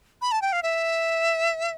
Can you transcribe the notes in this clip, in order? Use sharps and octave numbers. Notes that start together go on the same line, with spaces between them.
B5
A5
G5
F5
E5